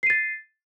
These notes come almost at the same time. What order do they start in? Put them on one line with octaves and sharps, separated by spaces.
C7 D#7 A6